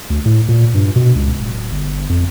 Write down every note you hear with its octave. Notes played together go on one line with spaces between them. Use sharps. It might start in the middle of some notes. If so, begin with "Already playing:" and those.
D2
A2
A#2
G2
B2
C#2
D1
G1
F2